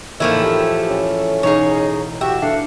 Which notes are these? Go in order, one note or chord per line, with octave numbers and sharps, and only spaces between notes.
A1 D#3 F3 A3 A#3 E4 G#4 D#7
G4
C#4
E1 D#4 G#4 C#5 F5
F#4 G4 E5
A3 D4 G4 F5 F#5